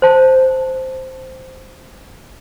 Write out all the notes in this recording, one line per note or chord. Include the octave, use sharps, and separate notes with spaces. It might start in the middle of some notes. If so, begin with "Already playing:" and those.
C5 A5